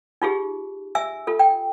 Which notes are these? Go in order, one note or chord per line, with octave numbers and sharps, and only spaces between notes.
D#4 F4 G4 G#4
E5 G#5 E6
F4 A4
G5